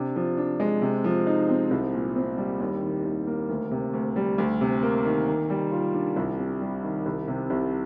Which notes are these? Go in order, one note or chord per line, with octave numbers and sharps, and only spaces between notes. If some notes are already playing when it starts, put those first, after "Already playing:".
Already playing: C3 D4
F3
D4
G#3
C3
F3
D#4
C4
C2
A#2
C4
G3
D#2
D#3
D#2
A#3
D2
C3
D2
G3
D2
C3
A#3
D#3
D#3
G3
F4
D4
C2
C3
G3
D#3
C2
C3
C2